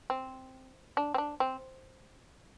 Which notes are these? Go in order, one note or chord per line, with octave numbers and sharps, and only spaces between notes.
C4
D4
C4
D4
C4